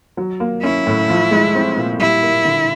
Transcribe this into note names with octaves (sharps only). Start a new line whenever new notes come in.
F#3
A#3
C#4 E4
A2
F3
G#3
C4
A#2
G3 E4
A#3
D3